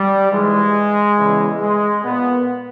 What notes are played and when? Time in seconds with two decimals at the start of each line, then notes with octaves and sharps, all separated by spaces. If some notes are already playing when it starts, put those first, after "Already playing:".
Already playing: G3
0.32 G#2 E3 G#3
1.18 E2 C#3 E3
1.61 G#3
2.04 A#2 B3